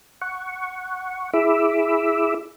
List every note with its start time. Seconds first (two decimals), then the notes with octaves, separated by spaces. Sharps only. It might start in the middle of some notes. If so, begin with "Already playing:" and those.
0.22 F#5 C#6
1.33 E4 G#4 E5 B5 D6 E6